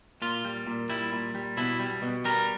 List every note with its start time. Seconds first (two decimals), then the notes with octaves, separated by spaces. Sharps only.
0.22 A#2 F4
0.45 G3
0.67 A#2
0.89 G3 E4
1.12 A#2
1.35 G3
1.57 B2 E4
1.79 G3
2.02 B2
2.25 G3 A#4